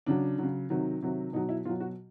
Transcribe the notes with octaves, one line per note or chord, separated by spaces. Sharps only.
C#3 F#3 D4
C#3 F#3
C3 D#3 F#3
C3 D#3 F#3
B2 F#3 D#4
E4
B2 F#3 F4
F#4